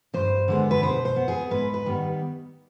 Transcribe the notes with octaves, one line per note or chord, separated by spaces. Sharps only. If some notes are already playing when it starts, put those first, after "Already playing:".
G2 C5
D3 G#3 B3
B4
B2 C5
C5
B3
G#4
G#2 B4
B4
D#3 G3 B3